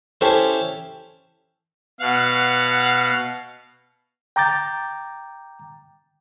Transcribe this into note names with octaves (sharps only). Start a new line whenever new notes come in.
C#4 E4 G4 A4 C5
B2 F5 F#5
G5 A#5 D6 G6 A6